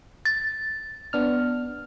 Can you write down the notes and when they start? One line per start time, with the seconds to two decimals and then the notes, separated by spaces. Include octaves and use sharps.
0.25 A6
1.13 B3 D4 F6